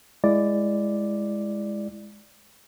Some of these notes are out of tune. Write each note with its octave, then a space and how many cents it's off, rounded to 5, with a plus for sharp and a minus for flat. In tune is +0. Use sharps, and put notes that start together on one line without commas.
G#3 +0 E4 +15 D5 +0